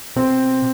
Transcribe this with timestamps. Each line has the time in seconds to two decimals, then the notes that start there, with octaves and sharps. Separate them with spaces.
0.16 B2 C4